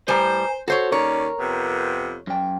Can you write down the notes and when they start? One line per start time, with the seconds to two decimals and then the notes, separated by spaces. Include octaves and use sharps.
0.08 A2 G3 B4 C5 G#5 A#5
0.68 F#4 A4 C5 C#5
0.92 D#2 C#4 A#4 C#5 D5
1.40 F2 C3 B3
2.27 F#2 G5